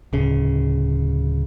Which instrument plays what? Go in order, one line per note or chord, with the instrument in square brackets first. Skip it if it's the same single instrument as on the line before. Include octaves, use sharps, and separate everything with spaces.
[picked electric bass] D1 C#3